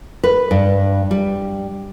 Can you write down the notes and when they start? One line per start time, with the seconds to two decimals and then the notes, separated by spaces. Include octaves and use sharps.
0.24 B4
0.51 G2
1.11 G3